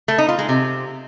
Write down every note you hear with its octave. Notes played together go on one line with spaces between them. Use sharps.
A3
D#4
F4
G#3
C3